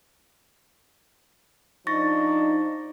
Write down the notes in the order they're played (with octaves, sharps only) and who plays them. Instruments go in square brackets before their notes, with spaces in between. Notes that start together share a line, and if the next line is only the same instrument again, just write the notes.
[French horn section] F3 D4 D#4 [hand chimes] C#6 A6 A#6